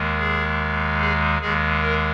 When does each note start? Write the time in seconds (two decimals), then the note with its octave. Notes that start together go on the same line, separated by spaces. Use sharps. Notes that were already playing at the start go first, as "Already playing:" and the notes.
Already playing: D#2 D#3 G#3
0.19 G#4
1.01 G#4
1.41 D#2 D#3 G#3 G#4
1.82 A#4